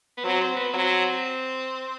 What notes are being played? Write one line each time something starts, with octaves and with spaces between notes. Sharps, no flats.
B3
F#3 C4
C4
B3
F#3 C4